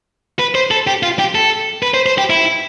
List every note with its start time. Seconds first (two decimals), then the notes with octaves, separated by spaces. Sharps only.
0.39 B4
0.55 C5
0.71 A4
0.87 G4
1.03 F4
1.19 G4
1.35 A4
1.83 B4
1.94 C5
2.06 C5
2.18 G4
2.30 E4